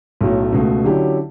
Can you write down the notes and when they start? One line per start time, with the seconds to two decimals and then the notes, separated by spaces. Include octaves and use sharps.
0.21 B1 A2 F#3 A3
0.52 C#2 B2 A3
0.84 D3 F#3 C#4 E4 G4